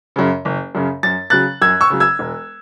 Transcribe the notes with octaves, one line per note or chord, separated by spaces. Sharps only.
F#2 C#3
F#1
F#2 C#3
F#2 A6
C#3 F#3 F#6 A6
F#2 E6 G#6
C#6 E6
C#3 F#3
E6 G#6
E1